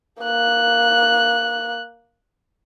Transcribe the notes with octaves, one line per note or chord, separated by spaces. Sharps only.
A#3 F#6